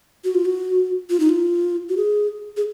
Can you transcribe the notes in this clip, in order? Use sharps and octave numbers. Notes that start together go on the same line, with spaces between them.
F#4
F4
F#4
F4
D#4
F4
F#4
G#4
G#4